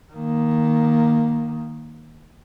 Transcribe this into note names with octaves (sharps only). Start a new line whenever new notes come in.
D#3 A#3